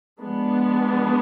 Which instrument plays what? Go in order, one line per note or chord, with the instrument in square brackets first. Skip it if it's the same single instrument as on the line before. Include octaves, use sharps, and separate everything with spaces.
[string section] F3 G#3 B3 D4